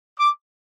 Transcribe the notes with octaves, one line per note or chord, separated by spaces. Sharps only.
D6